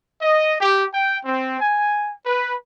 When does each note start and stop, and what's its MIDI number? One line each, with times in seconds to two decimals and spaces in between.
0.22 0.55 75
0.60 0.86 67
0.94 1.19 79
1.25 1.56 60
1.61 2.12 80
2.26 2.55 71